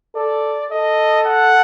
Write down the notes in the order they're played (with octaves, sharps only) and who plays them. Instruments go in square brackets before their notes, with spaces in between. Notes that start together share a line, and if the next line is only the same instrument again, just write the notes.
[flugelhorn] A4 [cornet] D5
[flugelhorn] A4 [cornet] D#5
[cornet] F#5